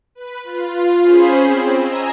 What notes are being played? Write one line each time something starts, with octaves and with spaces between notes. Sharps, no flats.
B4
F4
C#4 G#4 C5 B5 C7
C4
D#5 G#5 A#5 E6